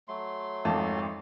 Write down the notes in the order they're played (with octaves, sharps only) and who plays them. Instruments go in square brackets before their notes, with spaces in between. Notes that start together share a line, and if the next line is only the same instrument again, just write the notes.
[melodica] F#3 A3 C6
[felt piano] G#1 F2 A5